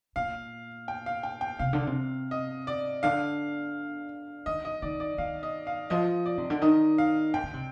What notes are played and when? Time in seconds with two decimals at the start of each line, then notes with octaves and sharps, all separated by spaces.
0.16 A#2 F5
0.88 G5
1.06 F5
1.23 G5
1.41 G5
1.59 C3 F5
1.73 D3
1.87 C3
2.31 D#5
2.67 D5
3.03 D3 F5
4.46 D#3 D#5
4.65 D#5
4.82 D#3 D5
5.00 D5
5.18 D#3 F5
5.43 D#5
5.67 F5
5.90 F3 D#5
6.26 D5
6.38 C3
6.50 D3
6.61 D#3 D#5
6.98 F5
7.34 C3 G5
7.43 D3
7.53 C3